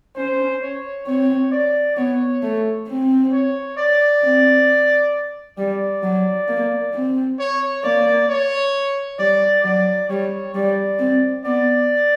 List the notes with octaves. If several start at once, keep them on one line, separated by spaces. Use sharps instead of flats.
C#4 C5
C#5
C4 C#5
D5
B3 C#5
A3
C4
C#5
D5
C4
G3 D5
F#3
A#3
C4
C#5
A#3 D5
C#5
G3 D5
F#3 D5
G3 C#5
G3 D5
C4
B3 D5